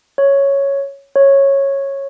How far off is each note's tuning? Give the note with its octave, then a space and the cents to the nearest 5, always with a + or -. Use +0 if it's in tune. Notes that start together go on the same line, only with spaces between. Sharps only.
C#5 +0
C#5 -10